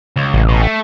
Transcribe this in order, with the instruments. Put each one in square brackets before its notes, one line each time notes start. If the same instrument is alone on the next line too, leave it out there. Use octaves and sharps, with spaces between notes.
[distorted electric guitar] C#2
[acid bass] A1
[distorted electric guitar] B2
A3